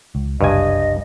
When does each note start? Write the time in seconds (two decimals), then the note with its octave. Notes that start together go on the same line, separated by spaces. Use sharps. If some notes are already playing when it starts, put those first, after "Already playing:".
0.15 C#2
0.41 F#1 C2 G2 D#5 G#5